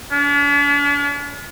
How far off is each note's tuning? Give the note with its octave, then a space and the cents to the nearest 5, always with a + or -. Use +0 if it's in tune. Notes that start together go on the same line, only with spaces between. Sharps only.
D4 -45